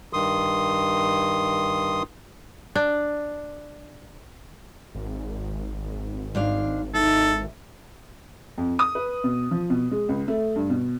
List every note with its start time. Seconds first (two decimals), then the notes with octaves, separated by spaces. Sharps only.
0.13 G2 D#3 C6 D#6
2.76 D4
4.95 G#1
6.35 G#2 D4 F5
6.94 D#4 E4 A4
8.58 F2
8.79 D#6
8.95 B4
9.24 B2
9.51 F3
9.70 B2
9.91 G#3
10.09 C#2
10.28 A3
10.56 G2
10.70 B2